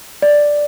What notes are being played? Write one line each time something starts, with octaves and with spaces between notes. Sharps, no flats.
D5